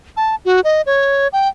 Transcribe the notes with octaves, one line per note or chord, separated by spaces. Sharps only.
A5
F#4
D#5
C#5
G5